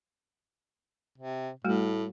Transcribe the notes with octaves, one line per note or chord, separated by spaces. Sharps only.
C3
A2 G3 A3 F#4